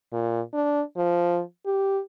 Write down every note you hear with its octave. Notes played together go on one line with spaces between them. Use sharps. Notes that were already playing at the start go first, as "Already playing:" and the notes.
A#2
D4
F3
G4